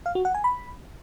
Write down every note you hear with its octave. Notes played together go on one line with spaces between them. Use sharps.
F5
F#4
F#5
G#5
B5